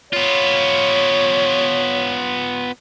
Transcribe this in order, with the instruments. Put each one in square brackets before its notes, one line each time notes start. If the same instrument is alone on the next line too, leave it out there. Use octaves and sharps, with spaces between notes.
[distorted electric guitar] B3 F4 [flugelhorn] C#5